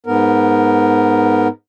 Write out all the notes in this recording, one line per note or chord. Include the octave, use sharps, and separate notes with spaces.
G#2 B3 A#4